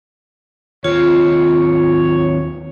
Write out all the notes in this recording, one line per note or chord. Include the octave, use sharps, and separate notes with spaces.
D#2 C4 F4 C#5